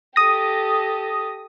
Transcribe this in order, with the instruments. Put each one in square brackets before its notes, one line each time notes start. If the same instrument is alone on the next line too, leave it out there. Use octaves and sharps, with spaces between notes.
[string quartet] G4 A4 [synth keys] D#6 A#6